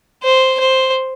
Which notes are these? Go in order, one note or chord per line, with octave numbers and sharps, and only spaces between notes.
C5
C5